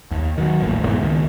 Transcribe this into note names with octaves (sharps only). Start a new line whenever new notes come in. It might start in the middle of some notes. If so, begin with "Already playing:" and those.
D#2
D#3 F#3
D#1 A1 A#2
F2 G#2 B2 E3
C#2 D#3